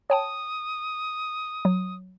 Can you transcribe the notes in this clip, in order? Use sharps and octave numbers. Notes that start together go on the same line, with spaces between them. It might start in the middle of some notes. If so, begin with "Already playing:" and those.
C#5 G5 A5 D#6
F#3